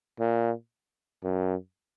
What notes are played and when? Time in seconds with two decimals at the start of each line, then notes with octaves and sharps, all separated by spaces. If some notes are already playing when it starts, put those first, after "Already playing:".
0.20 A#2
1.24 F#2